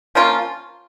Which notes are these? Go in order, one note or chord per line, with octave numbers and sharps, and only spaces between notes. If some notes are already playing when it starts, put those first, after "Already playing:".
F3 A#3 C#4 F4